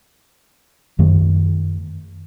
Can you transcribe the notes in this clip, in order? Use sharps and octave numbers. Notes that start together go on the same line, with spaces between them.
F#2 D#3 A3